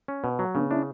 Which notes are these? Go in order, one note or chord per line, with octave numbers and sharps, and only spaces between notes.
C#4
B2
F#3
C#3 B3 D4
C#4 D4 E4